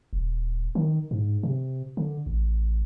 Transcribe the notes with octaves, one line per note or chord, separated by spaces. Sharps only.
D#1
D#3
G#2
C3
D3
A1